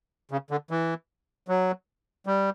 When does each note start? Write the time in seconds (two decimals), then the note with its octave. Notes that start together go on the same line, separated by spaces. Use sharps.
0.31 C#3
0.51 D3
0.71 E3
1.48 F#3
2.26 G3